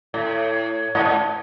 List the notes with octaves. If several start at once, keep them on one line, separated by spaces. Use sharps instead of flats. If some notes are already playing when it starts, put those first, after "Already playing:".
A2
G#2
G#2